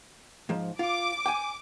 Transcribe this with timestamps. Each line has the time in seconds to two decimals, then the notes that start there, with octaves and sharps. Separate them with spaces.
0.49 G#2 F3
0.79 F4 D6
1.26 G5 G#5